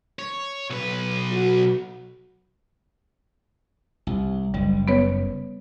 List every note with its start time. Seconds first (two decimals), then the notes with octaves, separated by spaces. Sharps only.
0.19 C#5
0.70 B1 B4
1.32 F#4
4.07 C2
4.54 F#1 G3
4.88 B3 B4 C#5